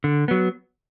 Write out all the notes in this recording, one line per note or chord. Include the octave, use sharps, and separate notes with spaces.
D3
F#3 B3